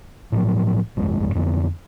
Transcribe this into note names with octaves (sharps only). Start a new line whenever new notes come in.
A2 F3 F#3
G1 C2 F2 G#3
F2 D3 B3